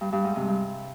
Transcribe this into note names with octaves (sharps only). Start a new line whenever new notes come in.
G2
G2
G#2
C3
G2